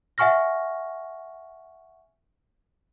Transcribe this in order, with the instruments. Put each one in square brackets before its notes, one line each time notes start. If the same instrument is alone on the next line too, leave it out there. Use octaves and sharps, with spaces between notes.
[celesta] E5 F#5 G#5 C#6 F6 A#6